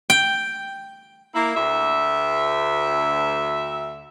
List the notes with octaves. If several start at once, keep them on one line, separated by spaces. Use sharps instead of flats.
G5
A#3 E4
D2 E5